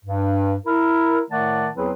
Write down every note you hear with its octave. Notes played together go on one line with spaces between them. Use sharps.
G2
E4 A#4
A2 D#3 A3 D5 F#5 A5
E2 F#3 C4 E4 G#4 B4